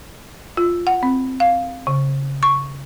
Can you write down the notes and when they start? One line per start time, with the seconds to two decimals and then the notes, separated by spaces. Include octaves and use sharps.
0.57 F4
0.87 F#5
1.03 C4
1.40 F5
1.87 C#3
2.43 C#6